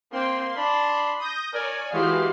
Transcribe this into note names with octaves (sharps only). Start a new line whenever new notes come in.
A#3 C4 G5 C6
D4 B5
D#6 G6 A#6
A#4 C#5 D5 G#5
E3 G#3 D#4 F#4 G4 F5 C6